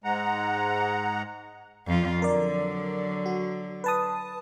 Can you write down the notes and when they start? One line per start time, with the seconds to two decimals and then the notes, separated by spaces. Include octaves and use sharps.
0.04 G#2 G#3 F#5 A#5
1.87 F2 F4
2.22 D3 F#3 A#4 D5
3.26 F#4
3.84 B4 A5 D#6